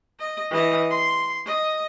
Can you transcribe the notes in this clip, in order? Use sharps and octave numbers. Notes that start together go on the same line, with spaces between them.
D#5
E3 D#5
C6
D#5